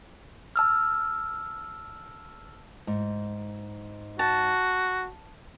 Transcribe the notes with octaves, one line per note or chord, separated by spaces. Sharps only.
A5 E6 F6
G#2
F#4 A5